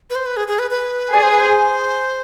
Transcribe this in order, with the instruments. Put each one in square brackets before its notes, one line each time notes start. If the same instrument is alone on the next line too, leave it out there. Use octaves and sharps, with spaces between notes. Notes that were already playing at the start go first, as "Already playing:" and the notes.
[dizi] B4
C5
B4
G#4
G#4
B4
B4
[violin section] G#4 [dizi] D5
[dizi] C5
B4
C5